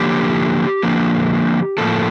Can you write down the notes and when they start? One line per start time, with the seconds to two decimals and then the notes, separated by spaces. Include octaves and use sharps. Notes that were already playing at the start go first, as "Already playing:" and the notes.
Already playing: D3 F3 A#3 G4
0.83 D3 F3 A#3
1.78 A2 F3 A#3 A4